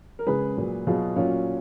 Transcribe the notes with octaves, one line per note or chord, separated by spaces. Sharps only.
A#4
C#3 G#3 G#4 B4
A#2 F#3
B2 F#3 F4 G#4
A#2 F#3 C#4 F4